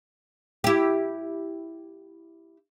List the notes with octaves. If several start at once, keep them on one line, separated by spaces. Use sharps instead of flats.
E4 G4